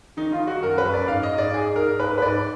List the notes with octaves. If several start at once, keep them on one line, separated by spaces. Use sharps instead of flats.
D#3 D#4
F4
D#3
F#4
F#2 A#4
B4
F#2
D5
G#2 F5
D#5
G#2
D5
G#2 G#4
G#2 A#4
G#2 B4
B4
G#2 D5